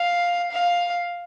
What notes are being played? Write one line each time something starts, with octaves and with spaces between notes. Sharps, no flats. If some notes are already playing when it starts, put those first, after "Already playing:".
Already playing: F5
F5